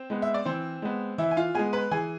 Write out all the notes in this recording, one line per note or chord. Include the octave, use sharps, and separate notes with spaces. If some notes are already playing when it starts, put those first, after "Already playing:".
Already playing: C4 C5
G#3 B3
E5
D5
E3 C4 C5
G#3 B3
E3 E4 E5
G#5
F4 F5
G#3 B3 G#4 G#5
B4 B5
E3 G#4 G#5